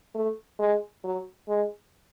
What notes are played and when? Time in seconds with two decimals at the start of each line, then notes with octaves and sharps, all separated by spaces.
0.15 A3
0.59 G#3
1.04 F#3
1.48 G#3